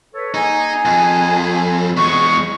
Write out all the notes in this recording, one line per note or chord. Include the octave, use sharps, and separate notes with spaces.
A4 B4 C#5
A#3 D#4 G#4 G#5
F2
E2 G#3 C#6